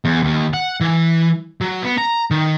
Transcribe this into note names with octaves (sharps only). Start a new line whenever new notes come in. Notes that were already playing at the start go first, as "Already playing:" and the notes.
E2
D#2
F#5
E3
F#3
B3
A#5
D#3